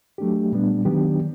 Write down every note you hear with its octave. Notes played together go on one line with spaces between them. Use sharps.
F#3 A3 D4 G4
A#2 G3 B3 D4
D#3 F#3 B3 D4 G4